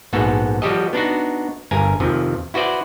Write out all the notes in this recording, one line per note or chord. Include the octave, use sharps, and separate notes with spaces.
A#1 G#2 B3 F#4 A4
F3 G3 F#4 G4 A4 D#5
B3 D4 D#4 F#4
G1 G2 A#4 G#5 A#5
F2 C3 D#3 F3
E4 F#4 B4 C5 D5